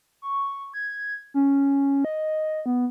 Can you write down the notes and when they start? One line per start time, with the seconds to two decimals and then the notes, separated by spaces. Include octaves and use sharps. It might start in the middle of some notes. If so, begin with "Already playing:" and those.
0.22 C#6
0.74 G#6
1.34 C#4
2.05 D#5
2.66 B3